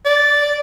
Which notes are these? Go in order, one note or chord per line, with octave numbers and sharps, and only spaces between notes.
D5